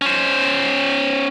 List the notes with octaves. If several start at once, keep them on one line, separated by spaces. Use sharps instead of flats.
C#4 C5